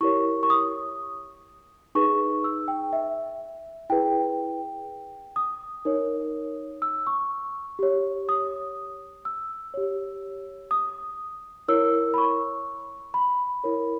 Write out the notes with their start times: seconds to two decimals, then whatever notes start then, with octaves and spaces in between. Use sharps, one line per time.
0.01 E4 G4 A#4 C#5 C#6
0.43 C#6
0.50 D#6
1.95 D#4 G#4 B4 C#6
2.44 E6
2.68 G5
2.93 E5
3.90 E4 G#4 B4 G5
5.36 D#6
5.85 D#4 A#4 C#5
6.82 E6
7.07 C#6
7.79 G4 C#5
8.29 D#6
9.25 E6
9.74 G4 C#5
10.71 D#6
11.68 E4 A#4 C#5 E6
12.14 B5
12.18 C#6
13.14 B5
13.64 E4 A#4 C#5